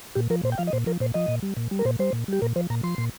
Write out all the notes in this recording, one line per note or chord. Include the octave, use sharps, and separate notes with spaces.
A#2 G4
F3 A#4
A#2 C5
G5
F3 F5
D#5
A#2 C5
F3 A#4
A#2 C5
F3 D#5
A#2
G3
A#2
G3
A#4
A#2 C5
G3 C5
A#2
G3 G4
A#2 A#4
F3 C5
A#2 A#5
F3 C6
A#2